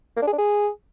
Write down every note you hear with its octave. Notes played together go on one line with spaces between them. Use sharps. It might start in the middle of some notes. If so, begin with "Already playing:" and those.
A#3
D4
G#4
D4
G#4